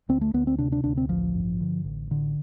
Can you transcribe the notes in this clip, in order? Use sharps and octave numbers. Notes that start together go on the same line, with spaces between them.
D2 C4
A3
D2 B3
C4
C3 D4
D4
D2 D4
C4
A1 F3
G2
D3
A1
A2 D3